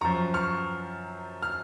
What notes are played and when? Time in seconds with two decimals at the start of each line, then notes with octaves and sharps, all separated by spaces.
0.01 F#2 A#5 C#6
0.05 F3
0.34 C#6 F6
1.43 F6